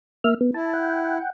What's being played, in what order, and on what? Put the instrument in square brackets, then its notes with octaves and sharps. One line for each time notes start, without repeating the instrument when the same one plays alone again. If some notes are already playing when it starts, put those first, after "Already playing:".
[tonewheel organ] A#3 E5 F6
B3
[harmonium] E4 [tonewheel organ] A5
[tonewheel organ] F#5 G5